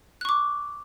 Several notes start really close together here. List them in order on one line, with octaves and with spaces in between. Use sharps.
F#6 C#6 D6